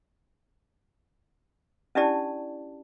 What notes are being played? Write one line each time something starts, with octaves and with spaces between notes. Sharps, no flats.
C#4 D4 E4 G4 D5 A5